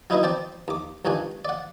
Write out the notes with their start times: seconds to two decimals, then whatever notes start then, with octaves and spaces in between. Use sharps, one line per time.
0.10 F#3 D#4 E4 B4 D#5 E5
0.23 C4 D5 G5 A5
0.68 D#2 D6
1.05 C#2 G2 D#3 D4 G#5
1.45 D5 F#5